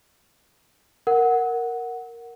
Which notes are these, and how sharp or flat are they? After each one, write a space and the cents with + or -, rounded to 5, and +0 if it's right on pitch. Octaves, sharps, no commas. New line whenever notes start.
A#4 +0 F#5 +0